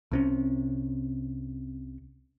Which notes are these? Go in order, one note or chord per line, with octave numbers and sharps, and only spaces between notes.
C2 C3 C#4